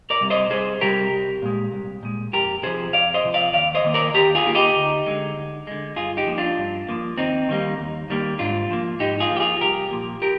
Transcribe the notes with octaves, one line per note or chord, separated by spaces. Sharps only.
A#4 D5
C3 G3
C5 D#5
C2 G#4 C5
C3 G3 G4 A#4
C2
A#2 G#3
C2
A#2 G#3
F2 G4 A#4
C3 F3 G#4 C5
F2 D5 F5
C5 D#5
C3 F3
D5 F5
D#2 D5 F5
C5 D#5
D#3 A#3
A#4 D5
D#2 G4 A#4
F4 G#4
D#3 A#3
D#4 G4
D2
D3 G#3
D2
D3 G#3
G2 F4 G#4
D#4 G4
F3 A#3
D4 F4
G2
F3 A#3
D#2 C4 D#4
D#3 G3 A#3
D#2
D#3 G3 A#3
G#2 D4 F4
F3 A#3
G#2 D#4 G4
F4 G#4
F3 A#3
G4
F4 G#4
C2 G4 A#4
A#2 F3 A#3
G4 A#4